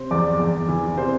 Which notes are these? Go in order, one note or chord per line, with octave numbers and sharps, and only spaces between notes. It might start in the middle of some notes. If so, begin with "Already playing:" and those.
Already playing: C3 C5
E2 D5 D6
E2
E3
C3 C5 C6